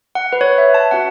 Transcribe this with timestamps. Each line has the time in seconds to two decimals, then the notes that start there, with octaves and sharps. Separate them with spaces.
0.15 F#5
0.33 B4
0.41 C#5
0.58 E5
0.74 A5
0.91 C#4 F#4 F#5